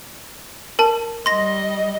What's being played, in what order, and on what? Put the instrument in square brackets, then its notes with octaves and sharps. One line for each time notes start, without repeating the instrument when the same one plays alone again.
[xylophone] A#4 A5
[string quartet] G3 D#5 [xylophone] C6 A#6